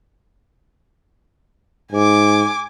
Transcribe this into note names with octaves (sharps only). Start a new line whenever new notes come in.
G#2 G#5 D6